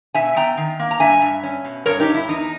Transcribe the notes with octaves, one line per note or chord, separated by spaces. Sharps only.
B2 E5 G#5
B3 G5 A#5
D#3
A#3
A#5
G2 E5 G#5
G2
C#4
B2
G2 A#4 C#5
D#4 G4
G2
E4
E2 D#4